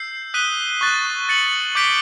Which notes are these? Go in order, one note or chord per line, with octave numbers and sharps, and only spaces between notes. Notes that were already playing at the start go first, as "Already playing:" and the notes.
Already playing: E6 G6 C7
D#6 F#6 B6 D#7 G7
C#6 F#6 A6
A6 C#7 F#7
D6 G6 B6 D7 G7